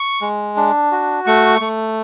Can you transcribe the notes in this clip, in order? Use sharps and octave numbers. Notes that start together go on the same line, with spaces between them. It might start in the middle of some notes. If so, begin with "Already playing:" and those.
Already playing: C#6
G#3
D4
F#4
A3 C#6
A3